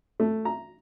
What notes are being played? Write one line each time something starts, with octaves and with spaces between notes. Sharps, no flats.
A3
A#5